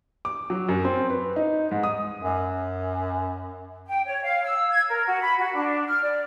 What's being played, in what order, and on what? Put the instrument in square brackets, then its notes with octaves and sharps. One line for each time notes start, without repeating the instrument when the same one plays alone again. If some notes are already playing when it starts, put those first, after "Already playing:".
[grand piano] D6
F#3
F#2
C4
B4
D#4
G#2
D#6
[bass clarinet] F#2
[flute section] G5
C#5
F5
E6
G#6
A#4
F#4
B5
F#4
D4
F6
D5